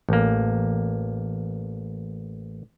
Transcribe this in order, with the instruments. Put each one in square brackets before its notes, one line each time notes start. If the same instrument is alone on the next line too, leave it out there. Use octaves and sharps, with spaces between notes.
[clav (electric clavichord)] A1 A#3